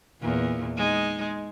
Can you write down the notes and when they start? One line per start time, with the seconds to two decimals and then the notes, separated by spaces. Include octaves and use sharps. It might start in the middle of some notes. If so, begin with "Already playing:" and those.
0.21 E2 A#2
0.77 G#3 D#4